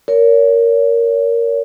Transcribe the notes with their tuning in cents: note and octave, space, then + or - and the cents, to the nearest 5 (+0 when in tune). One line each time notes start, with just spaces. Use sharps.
A#4 +0 C#5 +30